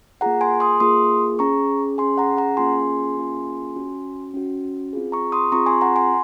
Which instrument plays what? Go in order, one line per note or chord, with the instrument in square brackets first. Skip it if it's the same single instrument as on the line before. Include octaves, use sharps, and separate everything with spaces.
[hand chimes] A#3 F4 G#4 F#5 A#5
G#5 C6
C6 D#6
A#3 F4 G#4 C6 D#6
C#4 G#4 A#5 C#6
C#4 G#4 G#5 C6
F#5 A#5
F#5 A#5
A#3 C#4 F4 G#4 G#5 C6
A#3 C#4 F4 G#4
C#4 F#4
C#4 F#4
C4 F4 G#4
A#5 C#6
C6 D#6
C4 F4 G#4 A#5 C#6
G#5 C6
F#5 A#5
G#5 C6